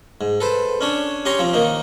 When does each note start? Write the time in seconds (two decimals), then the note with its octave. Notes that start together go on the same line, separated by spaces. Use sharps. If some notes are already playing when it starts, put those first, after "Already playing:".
0.21 G#2
0.40 A4 B4 C5
0.81 C#4 D4 C#5
1.25 C#4 G4 C#5 A#5 C6 C#6
1.39 F3 C4
1.53 D#3 A#3 D#4